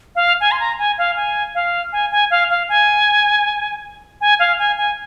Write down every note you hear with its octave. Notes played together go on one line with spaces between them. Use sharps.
F5
G#5
C6
A#5
G#5
F5
G#5
F5
G#5
G#5
F5
F5
G#5
G#5
F5
G#5
G#5